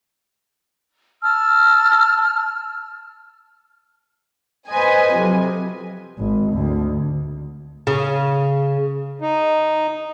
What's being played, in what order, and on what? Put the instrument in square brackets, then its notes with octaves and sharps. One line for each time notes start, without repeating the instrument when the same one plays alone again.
[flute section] A5 E6 F6
[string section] B4 C5 D#5 G#5
F2 C3 F#3
[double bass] G#1
D2
[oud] C#3
[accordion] D#4